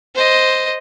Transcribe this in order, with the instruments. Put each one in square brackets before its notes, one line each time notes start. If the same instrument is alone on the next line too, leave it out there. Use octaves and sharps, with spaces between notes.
[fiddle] C5 D#5